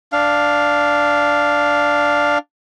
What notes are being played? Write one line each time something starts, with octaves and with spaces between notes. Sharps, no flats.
D4 F5